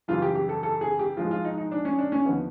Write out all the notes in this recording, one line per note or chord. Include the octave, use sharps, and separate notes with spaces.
F#2 C#3 E3 G3 F4
G4
G4
A4
A4
G#4
G4
G#2 F3 G#3 F4
F4
D#4
D#4
D4
C#4
D4
C#4
D#2 D3 F3 B3